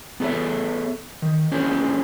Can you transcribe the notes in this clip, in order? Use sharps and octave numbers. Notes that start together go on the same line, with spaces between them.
B3 G#4 A4 B4 C#5 E5
D#3
A#3 C#4 D4 G#4 A#4 C5